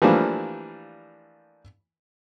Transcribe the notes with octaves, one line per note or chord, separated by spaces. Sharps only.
E3 F3 G3 A3 A#3 D4